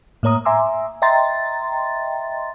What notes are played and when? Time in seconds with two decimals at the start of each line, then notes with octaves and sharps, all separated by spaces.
0.23 A2 A#3 C#5 A#5 D#6
0.45 E5 G#5 A#5 C6 D6 E6
1.02 D#5 E5 G5 A#5 C6 A6